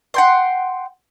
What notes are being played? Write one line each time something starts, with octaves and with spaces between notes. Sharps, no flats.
F#5 G5 C6